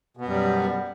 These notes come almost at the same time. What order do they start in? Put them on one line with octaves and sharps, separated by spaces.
B2 B3 F#2 G3